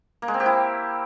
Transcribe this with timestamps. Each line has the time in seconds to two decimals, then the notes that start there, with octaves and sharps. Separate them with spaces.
0.22 A#3
0.28 G#3
0.34 C4
0.40 G4
0.46 E4